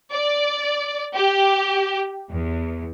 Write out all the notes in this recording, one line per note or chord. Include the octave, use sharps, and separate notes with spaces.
D5
G4
E2